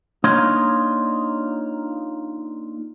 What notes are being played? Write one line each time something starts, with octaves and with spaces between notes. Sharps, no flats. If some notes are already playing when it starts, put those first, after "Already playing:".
A#3 D4 D#4 F4 C#5 D#5